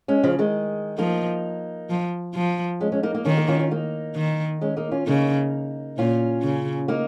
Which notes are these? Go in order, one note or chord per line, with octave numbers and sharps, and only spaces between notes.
G#3 C#4
C#3 F3
D#3 G#3
F3 A#3 D#4
F3
F3
G#3 C#4
G#3 C#4
A#3 D#4
A#3 D#4
D#3 C#4 F4
A#3 D#4
C#4 F4
C#4 F4
A#3 D#4
D#3
G#3 C#4
A#3 D#4
C#4 F4
C#3 A#3 D#4
A#2 C#4 F4
C#3
A#3 D#4